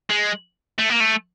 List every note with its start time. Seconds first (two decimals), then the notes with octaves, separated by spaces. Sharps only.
0.10 G#3
0.79 A3
0.89 A#3
1.00 A3